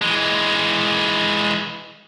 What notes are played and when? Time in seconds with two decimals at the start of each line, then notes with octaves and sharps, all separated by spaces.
0.02 E3 G#3